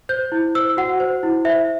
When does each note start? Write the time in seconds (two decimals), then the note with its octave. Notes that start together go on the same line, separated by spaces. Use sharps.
0.09 C5 G6
0.32 E4
0.55 C5 E6
0.77 F#4 F#5
1.00 C5
1.23 E4
1.45 C5 E5